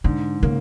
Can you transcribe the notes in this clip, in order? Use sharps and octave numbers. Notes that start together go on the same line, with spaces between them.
G#2 D3
C#3 A#3